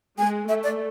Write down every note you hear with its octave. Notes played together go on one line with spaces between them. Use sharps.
G#3 G#5
A3 E5
D5